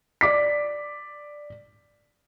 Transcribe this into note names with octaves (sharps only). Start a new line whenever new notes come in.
D5 D6 B6